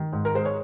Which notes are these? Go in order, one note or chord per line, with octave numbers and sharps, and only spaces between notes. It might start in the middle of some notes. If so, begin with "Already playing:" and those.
Already playing: D#3
G#2
A#4
G#3 C5
C#5